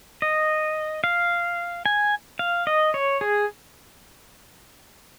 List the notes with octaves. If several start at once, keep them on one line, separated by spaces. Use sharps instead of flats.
D#5
F5
G#5
F5
D#5
C#5
G#4